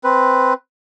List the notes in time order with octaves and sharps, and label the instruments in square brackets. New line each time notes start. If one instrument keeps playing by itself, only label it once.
[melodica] C4 B4